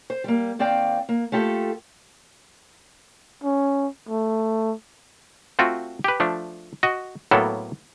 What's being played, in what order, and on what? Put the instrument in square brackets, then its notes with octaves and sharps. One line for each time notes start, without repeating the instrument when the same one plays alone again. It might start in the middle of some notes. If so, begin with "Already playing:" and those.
[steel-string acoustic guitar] C5
G3 A#3
D#2 C4 D5 F5 G5
A#3
A3 F4 G4 A4
[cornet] C#4
A3
[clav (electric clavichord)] A3 C4 F4 F#4
G4 B4
F3 A3 D4
F#4 D#5
A2 F#3 A#3 B3 A4